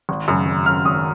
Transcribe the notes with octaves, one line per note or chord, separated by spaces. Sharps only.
G#1
F#2 C#3
G#1
F#2 C#3 F6
G#1 D#6